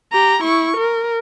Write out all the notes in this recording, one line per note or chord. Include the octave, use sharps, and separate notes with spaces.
G4 A#5
E4 C#6
A#4